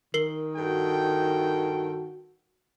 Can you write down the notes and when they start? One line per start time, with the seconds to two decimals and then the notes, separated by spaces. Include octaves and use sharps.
0.14 D#3 A#4 C7 G7
0.57 G2 F#4 A4 G5